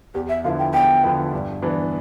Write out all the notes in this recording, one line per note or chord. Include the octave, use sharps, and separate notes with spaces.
E2 G4
E5
D3 F3 B3 E4 F5
G5
E2 G5
D3 F3 B3 E4
G2
E3 B3 D4